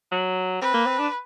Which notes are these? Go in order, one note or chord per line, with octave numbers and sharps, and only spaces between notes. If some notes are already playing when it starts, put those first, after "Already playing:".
F#3
C4 B4
A#3
C4
D4